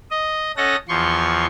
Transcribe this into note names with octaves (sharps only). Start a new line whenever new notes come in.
D#5
C#4 A4 D#5 F#5 A#6
E2 F3 C6 C#6